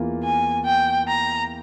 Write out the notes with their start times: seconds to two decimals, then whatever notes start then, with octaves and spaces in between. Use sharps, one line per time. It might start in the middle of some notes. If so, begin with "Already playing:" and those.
Already playing: E2 E3 A#3 F4
0.24 G#5
0.66 G5
1.08 A#5